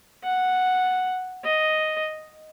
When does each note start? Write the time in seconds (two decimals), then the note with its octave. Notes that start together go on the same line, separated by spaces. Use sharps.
0.24 F#5
1.44 D#5